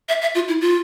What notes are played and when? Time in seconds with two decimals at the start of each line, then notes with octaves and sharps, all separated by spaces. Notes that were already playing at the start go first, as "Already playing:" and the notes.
0.08 E5
0.21 E5
0.35 F4
0.48 E4
0.61 F4